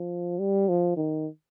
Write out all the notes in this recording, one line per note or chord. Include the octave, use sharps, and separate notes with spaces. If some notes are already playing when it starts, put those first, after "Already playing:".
Already playing: F3
G3
F3
D#3